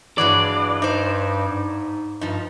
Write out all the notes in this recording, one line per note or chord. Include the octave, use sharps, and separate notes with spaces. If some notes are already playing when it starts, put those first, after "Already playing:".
G2 E3 F#3 G#3 D5
D#4 C5
G#2
G2 F3 D#4